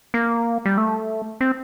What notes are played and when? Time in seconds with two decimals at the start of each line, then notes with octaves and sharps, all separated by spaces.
0.14 A#3
0.66 G3
0.78 A3
1.41 C4